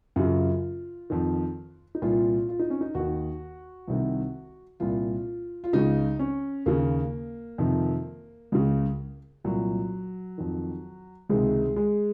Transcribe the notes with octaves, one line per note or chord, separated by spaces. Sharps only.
F#2 C#3 F4
F2 D#3
D#4
C2 A#2 F4
F4
D#4
C#4
D#4
D#2 D#3 F#4
C2 C3 D#3
C2 A#2 F4
F4
C#2 C#3 D#4
C#4
D#2 C#3 A#3
F2 C3 D#3
C#2 C#3
C2 A#2 F#3
F2 D#3
C#2 C3 D#3 G#3
G#3